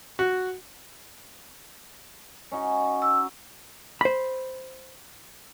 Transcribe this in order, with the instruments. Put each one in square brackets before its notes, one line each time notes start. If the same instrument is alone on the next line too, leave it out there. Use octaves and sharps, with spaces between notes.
[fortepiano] F#4
[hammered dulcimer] C#4 D#4 F#4
[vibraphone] E6
[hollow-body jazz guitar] C5 B5